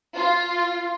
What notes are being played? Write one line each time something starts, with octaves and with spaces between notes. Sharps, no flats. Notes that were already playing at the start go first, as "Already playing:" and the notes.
F4